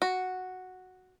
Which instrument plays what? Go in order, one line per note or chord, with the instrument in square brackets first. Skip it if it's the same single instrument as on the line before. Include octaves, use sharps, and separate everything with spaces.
[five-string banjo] F#4